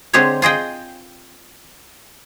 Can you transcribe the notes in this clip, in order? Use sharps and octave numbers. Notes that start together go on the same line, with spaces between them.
D3 G#3 C4 G4 G#4 C#5
F4 G#4 D#5 G5